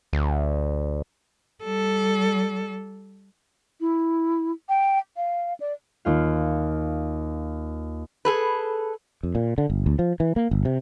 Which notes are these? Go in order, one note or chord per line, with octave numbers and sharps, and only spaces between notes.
D2
G3 A4
E4
G5
F5
D5
D#2 F4 F5
G#4 A4 B4
F2
A#2
D3
G1
D2
F3
E3
A#3
G1
C3